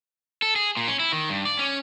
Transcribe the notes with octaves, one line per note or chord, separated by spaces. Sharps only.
A4
G#4
A#2
C#4
E4
D#3
G2
D5
C#4